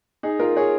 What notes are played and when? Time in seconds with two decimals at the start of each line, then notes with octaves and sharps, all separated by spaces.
0.23 D#4 G#4
0.40 F4 A#4
0.56 G#4 C#5